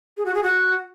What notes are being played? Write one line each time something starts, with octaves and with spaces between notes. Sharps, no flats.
G#4
F#4
G#4
F#4